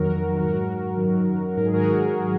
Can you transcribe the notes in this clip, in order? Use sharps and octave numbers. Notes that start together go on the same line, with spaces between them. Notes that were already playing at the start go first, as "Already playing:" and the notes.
Already playing: F2 D#3 F#3 F#4 A#4
G#2 F#3 F#4 A#4
F#2 D#3 F#3
G#2 D#3 F#3 A#4
G#4
F#4 A#4